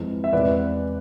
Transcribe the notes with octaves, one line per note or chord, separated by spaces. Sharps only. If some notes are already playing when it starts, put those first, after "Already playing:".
Already playing: F2 E3 G#3
E5
E2 C3 G#3 B4 D5